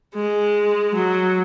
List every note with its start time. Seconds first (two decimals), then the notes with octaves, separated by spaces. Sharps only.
0.15 G#3
0.95 F#3